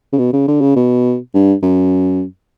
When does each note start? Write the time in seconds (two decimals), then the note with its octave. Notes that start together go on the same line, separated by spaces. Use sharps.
0.12 C#3
0.18 B2
0.33 C#3
0.48 D3
0.61 C#3
0.76 B2
1.34 G2
1.62 F#2